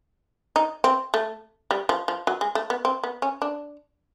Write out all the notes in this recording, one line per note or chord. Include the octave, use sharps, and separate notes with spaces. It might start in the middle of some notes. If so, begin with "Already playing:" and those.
D#4
C4
A3
G3
F3
F3
F#3
G#3
A3
B3
C4
B3
C#4
D4